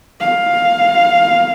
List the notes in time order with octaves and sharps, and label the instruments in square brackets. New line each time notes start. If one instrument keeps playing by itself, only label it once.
[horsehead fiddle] F5